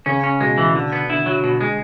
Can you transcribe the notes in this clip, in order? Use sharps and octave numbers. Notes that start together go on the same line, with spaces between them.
C#3 C#4
C#4
B2 G#3
E3
D3
B3
D3 E4
F#3
B2
G#3